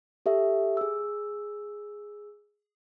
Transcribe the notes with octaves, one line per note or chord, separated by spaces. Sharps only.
G4 A4 E5
G#4 E6